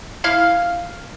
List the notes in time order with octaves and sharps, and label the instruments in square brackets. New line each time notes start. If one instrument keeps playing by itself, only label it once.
[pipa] E4 F5